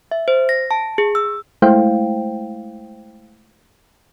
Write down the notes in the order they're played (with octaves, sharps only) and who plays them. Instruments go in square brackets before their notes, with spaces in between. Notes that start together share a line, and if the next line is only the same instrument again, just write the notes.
[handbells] E5
C5
A#6
A5
G#4
E6
[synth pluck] G#3 A3 E4 C5 F5 G5